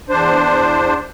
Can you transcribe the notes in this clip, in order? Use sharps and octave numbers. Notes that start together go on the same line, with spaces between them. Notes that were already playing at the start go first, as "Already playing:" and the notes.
E2 D4 C5